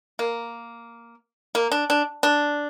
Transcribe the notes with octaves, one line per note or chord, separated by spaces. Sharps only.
A#3
A#3
D4
D4
D4